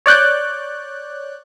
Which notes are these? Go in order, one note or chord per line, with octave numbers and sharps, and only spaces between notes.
C#5 D5 F#6 G6